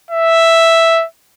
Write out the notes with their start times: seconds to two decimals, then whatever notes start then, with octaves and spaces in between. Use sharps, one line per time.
0.11 E5